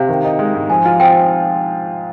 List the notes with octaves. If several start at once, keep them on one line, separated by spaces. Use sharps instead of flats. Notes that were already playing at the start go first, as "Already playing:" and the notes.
Already playing: C3 F5
D#3
D#4
G#3
G#2
F3 G#5
F4
C4 G5